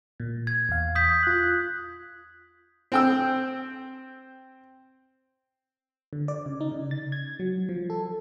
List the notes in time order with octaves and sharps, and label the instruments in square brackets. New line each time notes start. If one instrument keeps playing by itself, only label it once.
[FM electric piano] A#2
[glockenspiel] G#6
[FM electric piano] E2 F5
[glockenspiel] D#6 G6 B6
[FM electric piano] F4 F#6
[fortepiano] C4 G5 E6
[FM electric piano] D3
D5
C#3
D#4
C#3
A6
G#6
F#3
F3
A4